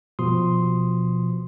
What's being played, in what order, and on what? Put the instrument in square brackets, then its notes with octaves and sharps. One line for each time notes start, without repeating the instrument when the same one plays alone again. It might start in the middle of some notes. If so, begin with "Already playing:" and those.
[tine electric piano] B2 F3 C6 D#6